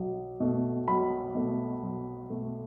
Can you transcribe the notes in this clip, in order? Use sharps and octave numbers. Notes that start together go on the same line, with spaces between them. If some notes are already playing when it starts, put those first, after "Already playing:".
Already playing: B1
B2 A3
B1 B5
B2 A3
B1
B2 A3